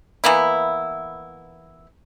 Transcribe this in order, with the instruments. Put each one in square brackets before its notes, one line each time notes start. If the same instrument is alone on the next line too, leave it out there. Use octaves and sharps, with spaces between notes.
[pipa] E3 A#3 B3 E4